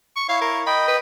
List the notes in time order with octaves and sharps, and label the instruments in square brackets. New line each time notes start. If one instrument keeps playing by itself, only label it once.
[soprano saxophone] C#6
[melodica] E4 C#5 [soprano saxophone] F5
[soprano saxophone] A#4
[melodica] D#5 G5 [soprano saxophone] B5
[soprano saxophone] B4